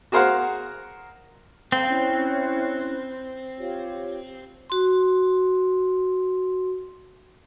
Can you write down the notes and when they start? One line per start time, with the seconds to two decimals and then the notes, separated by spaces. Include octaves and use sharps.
0.12 F#4 G#4 A#4 C5 F5 F#5
1.72 C4 A4 F5 A#5
1.88 C#4 E4 F#6
3.57 F4 G4 C#5
4.70 F#4 C6